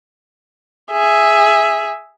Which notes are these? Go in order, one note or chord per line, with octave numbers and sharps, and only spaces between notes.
G#4 E5